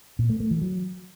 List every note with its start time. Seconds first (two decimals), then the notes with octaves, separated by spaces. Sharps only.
0.19 A#2
0.29 A3
0.40 A3
0.51 E3
0.62 F#3